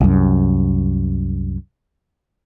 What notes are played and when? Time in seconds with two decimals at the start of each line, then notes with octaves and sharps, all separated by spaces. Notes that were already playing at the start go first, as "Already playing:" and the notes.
0.01 C2 F#2